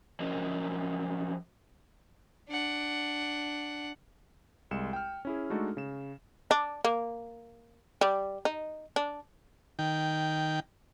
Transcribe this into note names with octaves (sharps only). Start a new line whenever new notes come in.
F3 F#3 C#4 A#4 D#5
D4 F#5
C2 G#3 C#7 E7
G5 F6
C#4 E4 G#4
G#3 A3 D4 D#4 F#4 A4
C#3 E7
D4
A#3
G3
D#4
D4
D#3 G5